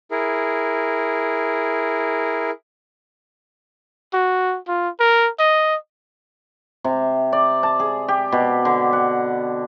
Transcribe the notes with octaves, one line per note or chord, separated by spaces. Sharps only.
E4 G#4 A#4
F#4
F4
A#4
D#5
C3
D5
A5
G#4
G4
B2
D3
F#5